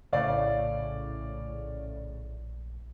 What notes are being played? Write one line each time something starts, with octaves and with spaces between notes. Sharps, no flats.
A#1 A2 C#3 C#5 D5 F5